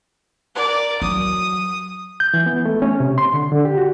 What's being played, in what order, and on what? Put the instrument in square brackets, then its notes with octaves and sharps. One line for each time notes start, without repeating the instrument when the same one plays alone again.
[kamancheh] A#4 D5
[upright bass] F#3 [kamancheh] D#6
[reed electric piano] G6
E3
B3
A3
C#4
C3
C6
D3
D3
G4
F#4